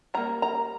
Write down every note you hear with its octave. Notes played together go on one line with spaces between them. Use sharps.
D#3 G3 A#3 A#5
A#5